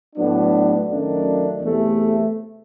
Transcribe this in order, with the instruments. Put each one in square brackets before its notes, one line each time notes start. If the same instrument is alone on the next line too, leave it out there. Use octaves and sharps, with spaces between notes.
[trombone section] A2 F#3 B3 D4
F#2 D#3 F#3 A3 D4
E2 C3 E3 A3